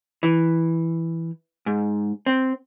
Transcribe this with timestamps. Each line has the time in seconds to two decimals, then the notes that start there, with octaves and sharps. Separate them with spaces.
0.23 E3
1.66 G#2
2.26 C4